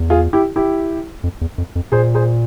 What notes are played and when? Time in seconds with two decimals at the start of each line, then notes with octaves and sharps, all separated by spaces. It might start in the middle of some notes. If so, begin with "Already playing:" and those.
Already playing: E2
0.10 F4 G#4
0.33 E4 G4
0.56 E4 G4
1.24 F2
1.41 E2
1.58 F2
1.75 F2
1.92 A#2 G#4 C5
2.15 G#4 C5